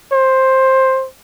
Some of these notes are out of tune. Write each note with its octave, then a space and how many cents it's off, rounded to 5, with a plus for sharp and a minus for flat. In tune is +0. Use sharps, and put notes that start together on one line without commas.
C5 +10